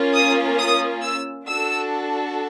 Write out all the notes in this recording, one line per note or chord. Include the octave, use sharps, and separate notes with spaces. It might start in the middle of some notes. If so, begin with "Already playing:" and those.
Already playing: A#3 C#4 F4
D#6
D#6
E6
D4 F#4 A4 E6